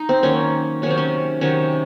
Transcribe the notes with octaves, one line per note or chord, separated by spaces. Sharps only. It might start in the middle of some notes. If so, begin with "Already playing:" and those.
Already playing: D#4
C4
D#3 F#3 A#3 C#4
C3 D#3 F#3 C#4
C4
C#4
C3 D#3 F#3 C#4